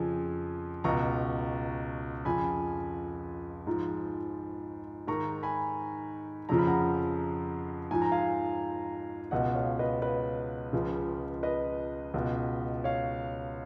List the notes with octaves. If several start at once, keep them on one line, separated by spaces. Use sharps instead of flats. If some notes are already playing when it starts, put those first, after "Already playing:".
Already playing: F2 C#3 F3 G#5
C#2 B2 A#5 C#6
F2 C#3 F3 G#5 B5
G#2 F3
G#2 D#3 A#5 C#6
G#5 B5
F2 C#3 F3 A#5
B5
F#5 A#5
G#2 F3 G#5
A#5
F5 G#5
C#2 B2 D#5 F#5
C#5 F5
B4 D#5
B4 D#5
C#2 C#3 F3
B4 D#5
C#2 B2
C#5 F5